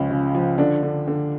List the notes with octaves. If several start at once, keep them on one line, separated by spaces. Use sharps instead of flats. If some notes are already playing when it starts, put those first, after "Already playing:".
Already playing: C#2 F3 C#4
C#3
F3
D3 D4
D3
D3